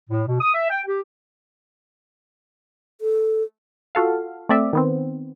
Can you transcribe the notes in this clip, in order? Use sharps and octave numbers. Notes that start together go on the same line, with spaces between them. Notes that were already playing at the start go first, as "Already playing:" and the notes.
A2
B2
D#6
E5
G5
G4
A4
F4 F#4 A4 F5
A3 C4 D5 E5
D#3 B3 C4